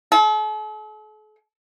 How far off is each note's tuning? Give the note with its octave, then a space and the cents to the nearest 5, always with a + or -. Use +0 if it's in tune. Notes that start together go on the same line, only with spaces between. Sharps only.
A4 -45